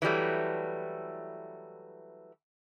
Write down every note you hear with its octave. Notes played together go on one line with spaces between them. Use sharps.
E3 F#3 G3 A3